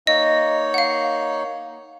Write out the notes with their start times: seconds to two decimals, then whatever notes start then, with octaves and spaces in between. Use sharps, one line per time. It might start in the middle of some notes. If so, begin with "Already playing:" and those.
0.07 A#3 D#4 C#5 D#5
0.74 F5 F#5